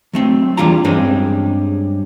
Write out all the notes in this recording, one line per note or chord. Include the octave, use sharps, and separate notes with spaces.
F#3 A3 C4
E2 E3 G3 D4 F4 A#5
G2 G3 G#3 C4 C#4